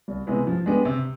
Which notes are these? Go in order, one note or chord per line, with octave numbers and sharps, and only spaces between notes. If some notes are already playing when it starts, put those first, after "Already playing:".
C2
C3 E3 G#3 B3
F3
G#3 B3 D4 G4
C3